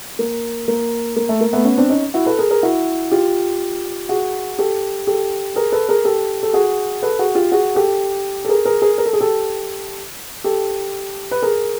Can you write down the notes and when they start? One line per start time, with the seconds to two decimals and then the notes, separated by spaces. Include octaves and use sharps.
0.19 A#3
0.68 A#3
1.16 A#3
1.29 A3
1.41 A#3
1.53 A3 B3
1.65 B3 C#4
1.78 C4 D4
1.89 C#4 D#4
2.14 E4 F#4
2.26 A4 B4
2.39 G#4 A#4
2.50 G#4 A#4
2.63 E4 F#4
3.11 F4 G4
4.09 F#4 G#4
4.59 G4 A4
5.07 G4 A4
5.56 G#4 A#4
5.72 A4 B4
5.89 G#4 A#4
6.05 G4 A4
6.43 A4
6.54 F#4 G#4
7.02 A4 B4
7.19 F#4 G#4
7.35 F4 G4
7.52 F#4 G#4
7.75 G4 A4
8.45 A4
8.49 G#4 A#4
8.65 G#4 A#4
8.82 G#4 A#4
8.98 A#4
9.06 A4
9.13 G#4
9.21 G4 A4
10.44 G4 A4
11.31 B4
11.42 G#4 A#4